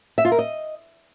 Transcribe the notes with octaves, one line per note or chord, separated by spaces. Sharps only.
E5
F4
A#4
D#5